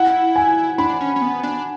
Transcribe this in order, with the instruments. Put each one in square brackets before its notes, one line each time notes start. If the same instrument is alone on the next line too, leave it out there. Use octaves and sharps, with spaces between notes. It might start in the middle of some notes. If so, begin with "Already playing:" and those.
Already playing: [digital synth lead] E4 [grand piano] F#5
[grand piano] G#5
[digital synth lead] D4 [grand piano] B5
[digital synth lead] C#4
C#4
B3
D4